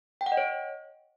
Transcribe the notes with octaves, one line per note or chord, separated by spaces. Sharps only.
G5
F#5
D#5
C#5